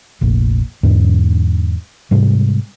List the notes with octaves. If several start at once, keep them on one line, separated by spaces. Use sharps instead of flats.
F1 A#1
E2 G#2 D3
G#2 C3 G3 G#3